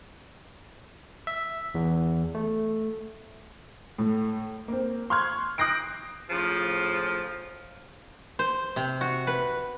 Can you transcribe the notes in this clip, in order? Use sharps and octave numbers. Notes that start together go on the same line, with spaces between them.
E5
E2
A3
A2
A#3 C4
C6 C#6 F6 F#6 G#6
D#6 F#6 G6 A#6 C7 D7
A2 C#3 F3
C5
C3
F#4
B4